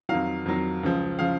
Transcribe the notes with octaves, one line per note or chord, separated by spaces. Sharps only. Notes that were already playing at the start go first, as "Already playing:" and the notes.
F2 D#3 F#3 F5
F2 D#3 F#3
C#2 C#3 F3
C#3 F3 F5